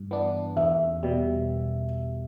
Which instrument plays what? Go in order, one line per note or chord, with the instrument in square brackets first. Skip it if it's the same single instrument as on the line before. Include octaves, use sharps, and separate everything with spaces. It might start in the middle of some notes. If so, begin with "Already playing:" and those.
Already playing: [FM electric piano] G2
E3 B3 D4
[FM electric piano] E2 [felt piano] E5
[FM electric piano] B2 G3